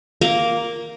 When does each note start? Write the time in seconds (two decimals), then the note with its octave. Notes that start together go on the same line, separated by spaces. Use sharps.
0.21 A#3